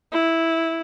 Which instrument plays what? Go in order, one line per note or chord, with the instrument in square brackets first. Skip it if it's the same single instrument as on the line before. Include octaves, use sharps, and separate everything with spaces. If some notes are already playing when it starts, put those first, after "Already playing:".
[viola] E4